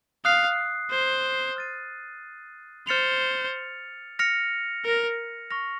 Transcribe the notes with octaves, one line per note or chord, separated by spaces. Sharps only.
F5 D#6 F#6 C7
C5
F6 A6 D#7
C5 F6 A6 C#7 F7
F6 A#6 C#7 F7
A#4
C#6 F6 A#6 F7